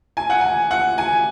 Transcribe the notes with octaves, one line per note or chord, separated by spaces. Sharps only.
G#5
F#5
G#5
F#5
G#5